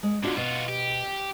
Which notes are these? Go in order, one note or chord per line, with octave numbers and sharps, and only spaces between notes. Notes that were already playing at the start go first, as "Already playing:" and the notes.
G#3
G#2 D3 D4 F4 F#4
B2 F4 F#4
G4